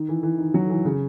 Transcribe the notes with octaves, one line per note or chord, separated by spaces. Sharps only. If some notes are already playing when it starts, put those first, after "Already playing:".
Already playing: D#3
E3
E3
D#3
F#3
E3
C#3